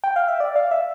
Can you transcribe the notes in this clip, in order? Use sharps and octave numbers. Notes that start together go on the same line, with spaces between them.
G5
F5
E5
D5
F5
E5